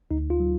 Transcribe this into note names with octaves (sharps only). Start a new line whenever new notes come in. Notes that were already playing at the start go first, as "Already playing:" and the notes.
D2 D#4
F4
F#3